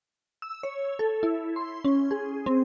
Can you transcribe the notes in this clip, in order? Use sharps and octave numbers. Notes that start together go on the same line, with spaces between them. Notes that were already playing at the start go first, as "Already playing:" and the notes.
E6
C#5
A4
E4
C6
C#4
G#4
C4